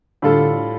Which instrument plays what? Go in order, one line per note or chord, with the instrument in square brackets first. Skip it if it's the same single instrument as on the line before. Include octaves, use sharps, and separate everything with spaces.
[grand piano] A2 G3 F4 A4 [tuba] D3